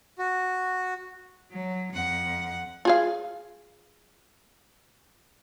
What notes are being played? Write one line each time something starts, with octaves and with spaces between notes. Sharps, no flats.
F#4
F#3
F2 F#5
F4 G#4 F5